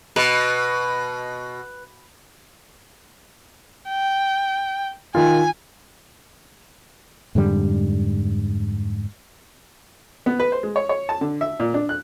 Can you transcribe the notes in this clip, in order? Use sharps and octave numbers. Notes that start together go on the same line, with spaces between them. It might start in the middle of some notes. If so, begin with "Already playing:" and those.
B2 B4
G5
D#3 F4 G#5
F2 G#2 D3 G3
B3
B4
C5
G#3
C#5
C#5
A5
D3
E5
A#2
D4
F#6